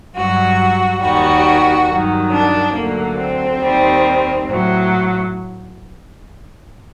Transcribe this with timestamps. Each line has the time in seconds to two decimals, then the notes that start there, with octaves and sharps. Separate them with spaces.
0.15 G2 F#3 F#4
1.01 D#2 D#3 G3 F#4
1.87 G2 D#3 F#3
2.30 D4
2.73 D2 D3 F#3 A#3
3.17 C4
3.60 D#2 D#3 G3
4.45 A2 F#3